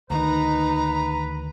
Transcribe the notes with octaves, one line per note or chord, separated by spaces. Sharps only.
D2 D#3 D#4 B4 A#5